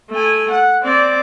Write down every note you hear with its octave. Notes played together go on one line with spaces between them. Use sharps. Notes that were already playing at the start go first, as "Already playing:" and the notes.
A3 G#5
F#5
C4 D5